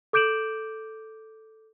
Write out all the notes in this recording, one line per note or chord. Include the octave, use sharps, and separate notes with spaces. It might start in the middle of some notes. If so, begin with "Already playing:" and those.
A4 D6 G6 D7 E7 F#7